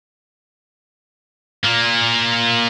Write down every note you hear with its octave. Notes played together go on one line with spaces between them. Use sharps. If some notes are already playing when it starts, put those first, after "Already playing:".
A#2 A#3